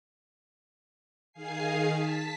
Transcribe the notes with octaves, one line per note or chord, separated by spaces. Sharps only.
D#3 G#4 F5 G#5 C7
A5 B6